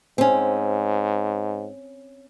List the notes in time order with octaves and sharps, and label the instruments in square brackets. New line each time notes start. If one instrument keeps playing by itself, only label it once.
[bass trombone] G#2 [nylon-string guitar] C4 C#4